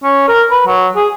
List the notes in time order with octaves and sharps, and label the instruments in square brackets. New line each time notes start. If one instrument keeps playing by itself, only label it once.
[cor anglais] C#4
A#4
B4
F#3
G#4